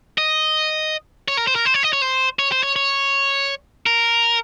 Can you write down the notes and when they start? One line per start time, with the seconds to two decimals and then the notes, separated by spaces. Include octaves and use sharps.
0.18 D#5
1.28 C#5
1.37 A#4
1.47 C5
1.55 A#4
1.65 C5
1.74 C#5
1.83 D#5
1.93 C#5
2.02 C5
2.39 C#5
2.52 C5
2.63 C#5
2.76 C#5
3.86 A#4